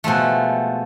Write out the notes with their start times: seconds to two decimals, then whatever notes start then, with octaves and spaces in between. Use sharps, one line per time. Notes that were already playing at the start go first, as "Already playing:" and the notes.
0.04 B2 F3 G#3 A3